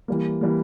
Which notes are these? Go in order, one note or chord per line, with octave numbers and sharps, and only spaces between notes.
E3 G3 A#3
E3 G3 A#3